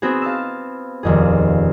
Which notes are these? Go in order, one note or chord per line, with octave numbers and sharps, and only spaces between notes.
B3 C4 F#4 G#4
F5 A5 E6
D#1 F2 G#4